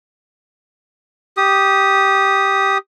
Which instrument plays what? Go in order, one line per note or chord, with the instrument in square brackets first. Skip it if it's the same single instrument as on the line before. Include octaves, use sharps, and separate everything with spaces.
[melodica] G4 D#6